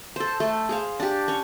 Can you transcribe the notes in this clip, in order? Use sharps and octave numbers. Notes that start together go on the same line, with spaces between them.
A4 C5
A3 A4
G#4 C5 F5
D4 G4
C#4 C#5